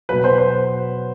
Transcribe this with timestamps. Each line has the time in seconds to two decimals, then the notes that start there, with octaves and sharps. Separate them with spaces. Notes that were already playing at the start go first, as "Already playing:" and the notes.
0.09 B2 F#3 B4
0.24 C5
0.38 C5